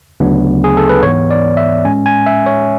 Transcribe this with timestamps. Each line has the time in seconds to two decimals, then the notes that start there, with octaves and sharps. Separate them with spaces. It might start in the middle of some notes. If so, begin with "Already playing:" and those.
0.20 D2 C#3 F#3 B3 D4
0.64 G#4
0.77 A4
0.89 B4
1.02 G#2 E3 B3 C#5
1.31 D5
1.57 E5
1.85 A2 G#3 C#4 G#5
2.06 G#5
2.26 E5
2.46 C#5